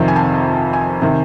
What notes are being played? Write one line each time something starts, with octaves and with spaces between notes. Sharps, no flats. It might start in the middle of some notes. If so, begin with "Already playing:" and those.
Already playing: F2 C3 D#3
G#5
A5
G#5
C3 D#3